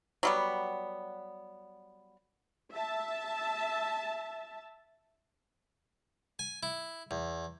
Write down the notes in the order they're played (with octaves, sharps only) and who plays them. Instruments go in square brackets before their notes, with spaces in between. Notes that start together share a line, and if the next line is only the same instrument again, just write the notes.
[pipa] F#3 G3 B3
[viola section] E5 A5
[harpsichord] G#5
E4
E2